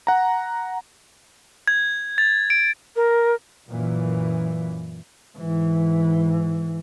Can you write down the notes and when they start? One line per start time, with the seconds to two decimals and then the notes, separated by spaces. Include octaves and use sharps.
0.07 F#5 A#5
1.68 G#6
2.18 A6
2.50 D7
2.95 A#4
3.67 F#2 A#2 E3
5.37 G#2 E3